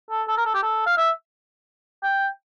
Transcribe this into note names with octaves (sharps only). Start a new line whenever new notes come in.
A4
A4
A#4
A4
G4
A4
F5
E5
G5